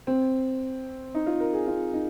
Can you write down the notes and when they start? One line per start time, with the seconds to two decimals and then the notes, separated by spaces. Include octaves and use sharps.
0.07 C4
1.14 D#4
1.27 F4
1.40 A#4
1.54 G#4
1.67 F4
1.94 D#4